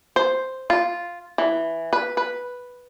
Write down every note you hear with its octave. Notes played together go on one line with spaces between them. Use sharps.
C5
F4
E3
B4
B4